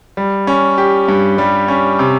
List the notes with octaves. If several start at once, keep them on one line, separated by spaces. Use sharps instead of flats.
G3
C#4
G4
G2
G3
C#4
C3